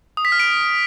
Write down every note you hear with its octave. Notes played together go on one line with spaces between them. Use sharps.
D#6
B6
F6
D7